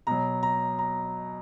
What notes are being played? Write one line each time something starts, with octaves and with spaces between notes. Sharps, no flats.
B2 F#3 A#5
A#5
A#5